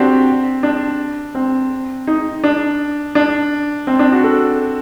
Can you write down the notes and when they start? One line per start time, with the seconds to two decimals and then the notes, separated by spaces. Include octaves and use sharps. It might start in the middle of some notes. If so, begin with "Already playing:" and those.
Already playing: C4 D4 F#4 G4
0.63 D4
1.35 C4
2.07 D#4
2.44 D4
3.15 D4
3.87 C4
3.99 D4
4.12 F#4
4.24 A4